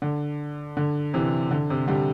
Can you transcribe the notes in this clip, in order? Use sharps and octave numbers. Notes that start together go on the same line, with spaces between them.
D3
D3
C3 E3
D3
C3
D3 G3